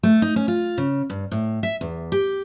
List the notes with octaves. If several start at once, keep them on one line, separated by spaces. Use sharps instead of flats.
A3
D#4
C#4
F4
C#3
G2
A2
E5
E2
G4